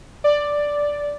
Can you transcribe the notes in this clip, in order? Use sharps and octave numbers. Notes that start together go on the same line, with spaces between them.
D5